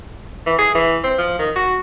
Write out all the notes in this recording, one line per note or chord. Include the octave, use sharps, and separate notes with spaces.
E3
G#4
E3
C4
F3
D#3
F#4